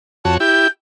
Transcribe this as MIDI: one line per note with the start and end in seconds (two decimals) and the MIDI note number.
0.25 0.38 41
0.25 0.38 66
0.25 0.38 73
0.25 0.35 81
0.40 0.68 64
0.40 0.68 67
0.40 0.67 91